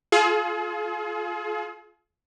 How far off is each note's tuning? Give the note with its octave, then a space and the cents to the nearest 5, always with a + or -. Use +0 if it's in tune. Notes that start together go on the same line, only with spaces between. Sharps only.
F4 +0 G#4 +40